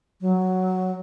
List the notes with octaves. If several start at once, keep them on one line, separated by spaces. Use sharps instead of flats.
F#3